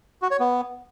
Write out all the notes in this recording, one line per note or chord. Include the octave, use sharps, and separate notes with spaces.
F#4
C#5
B3